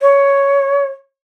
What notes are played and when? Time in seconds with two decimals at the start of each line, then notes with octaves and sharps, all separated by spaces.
0.02 C#5